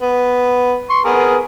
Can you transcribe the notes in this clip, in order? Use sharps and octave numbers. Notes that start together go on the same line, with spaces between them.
B3
C6 C#6
B3 G#4 A#4